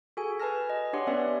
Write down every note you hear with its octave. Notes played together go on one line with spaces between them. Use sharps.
F#4 G#4 A4 G#5
B4 G#5 A5 F6 A#6
D#5
D4 G4 C#5 F#5 C6
B3 C#4 B4 D5 E5 F#5